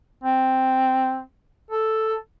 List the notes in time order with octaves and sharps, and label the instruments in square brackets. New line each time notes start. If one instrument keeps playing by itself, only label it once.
[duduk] C4
A4